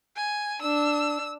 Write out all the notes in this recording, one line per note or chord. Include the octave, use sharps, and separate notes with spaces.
G#5
D4 E6